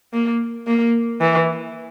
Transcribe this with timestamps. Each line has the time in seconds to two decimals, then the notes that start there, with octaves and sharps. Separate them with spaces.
0.13 A#3
0.67 A#3
1.21 E3